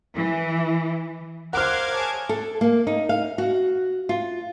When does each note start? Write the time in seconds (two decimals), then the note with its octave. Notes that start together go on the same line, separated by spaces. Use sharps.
0.16 E3
1.53 A#4 C5 F5 F#5 D6 F6 F#6 G#6
1.94 G#4 C#5 A5
2.29 A4
2.61 A#3
2.87 D#4
3.09 F5
3.38 F#4
4.09 F4